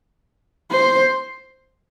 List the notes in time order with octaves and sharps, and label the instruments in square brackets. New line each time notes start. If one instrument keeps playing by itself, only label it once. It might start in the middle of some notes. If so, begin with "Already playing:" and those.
[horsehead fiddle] C5